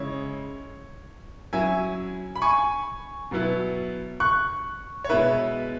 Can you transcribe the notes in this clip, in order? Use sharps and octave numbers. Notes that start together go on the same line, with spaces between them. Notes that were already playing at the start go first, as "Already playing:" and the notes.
Already playing: C#3 G#3 E4 C#5
F#3 C#4 E4 E5 G#5
B5
G#5 C#6
B2 F#3 B3 E4
C#6 F#6
C#5
B2 G#3 B3 E4 B4 E5